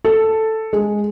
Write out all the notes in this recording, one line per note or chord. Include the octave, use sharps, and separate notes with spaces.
A4
G#3